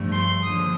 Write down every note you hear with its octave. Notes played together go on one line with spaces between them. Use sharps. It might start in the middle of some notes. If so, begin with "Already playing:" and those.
Already playing: G2 F3 A3
C6
D#2 D3 F3 D#6